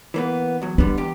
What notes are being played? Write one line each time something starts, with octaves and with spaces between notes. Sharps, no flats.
E3 A#3 B3
E2 F#3
D3 G3 B3 D4
E2 G4